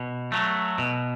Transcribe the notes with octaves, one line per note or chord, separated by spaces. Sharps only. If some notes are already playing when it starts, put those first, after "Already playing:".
Already playing: B2
F#3 A3
B2